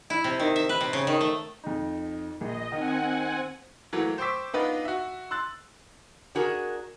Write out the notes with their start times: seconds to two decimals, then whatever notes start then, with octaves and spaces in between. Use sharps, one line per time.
0.10 E4
0.24 C3
0.40 D#3
0.56 E5
0.69 B4
0.81 C3
0.93 C#3
1.07 D#3
1.21 A3
1.64 F2 D#4
2.41 A#1 D#5
2.72 D#3 C4 F#5 G#5
3.93 E3 F#3 A3 A#3
4.18 C5 G5 C#6 D6 E6 B6
4.54 B3 D4 D#4 F4 B4 D#5
4.85 F#4 E5
5.31 C6 E6 F#6 A6
6.35 D4 F#4 G#4 A#4